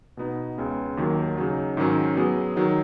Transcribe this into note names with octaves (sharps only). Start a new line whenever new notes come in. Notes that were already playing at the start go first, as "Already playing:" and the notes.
B2 B3 D#4
C#2 C#3 B3
D#2 D#3 F#3
C#3 F#3 D#4
G#2 D#3 F#3 C#4
F#3 B3 G#4
D#3 F#3 D#4